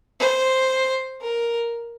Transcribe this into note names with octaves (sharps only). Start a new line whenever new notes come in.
C5
A#4